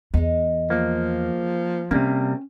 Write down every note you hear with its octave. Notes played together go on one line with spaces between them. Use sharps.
E2 G#3 D#4
F3 A#3
C3 G3 A3 A#3 C4 C#4 F#4